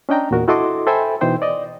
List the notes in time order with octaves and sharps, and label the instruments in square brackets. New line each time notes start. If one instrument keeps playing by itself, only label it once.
[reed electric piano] C#4 D4 D#5 G5 A#5
E2 A#2 F#4 A#4
E4 F#4 A4 D#5 C6 D6
A4 C5 E5 G5 G#5 B5
B2 E3 D#4 C5 G5
D5 D#5